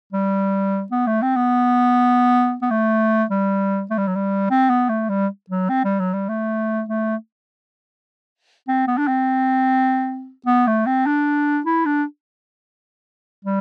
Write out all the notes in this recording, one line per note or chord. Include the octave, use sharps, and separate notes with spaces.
G3
B3
A3
C4
B3
B3
A3
G3
A3
G3
F#3
G3
C4
B3
A3
G3
F#3
C4
G3
F#3
G3
A3
A3
C4
B3
D4
C4
B3
A3
C4
D4
E4
D4
G3